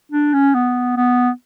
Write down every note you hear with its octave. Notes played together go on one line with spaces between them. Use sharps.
D4
C#4
B3
B3